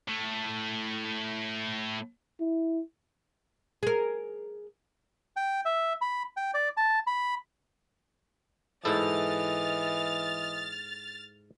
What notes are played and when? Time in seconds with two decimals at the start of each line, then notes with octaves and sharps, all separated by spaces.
0.08 A2 A3
2.40 E4
3.83 G#4 A#4
5.36 G5
5.65 E5
6.01 B5
6.37 G5
6.54 D5
6.77 A5
7.07 B5
8.85 G#2 E3 E4 A4 D#5 F6 A6